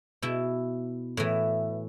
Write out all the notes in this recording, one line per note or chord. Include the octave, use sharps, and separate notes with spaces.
B2 E4
A2 E3